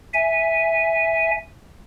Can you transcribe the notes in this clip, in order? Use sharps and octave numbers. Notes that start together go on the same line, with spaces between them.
E5 G#5